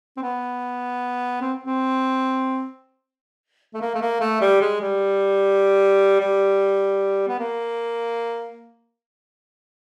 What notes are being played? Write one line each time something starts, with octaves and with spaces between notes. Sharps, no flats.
C4
B3
C4
C4
A3
A#3
A3
A#3
A3
G3
G#3
G3
G3
B3
A#3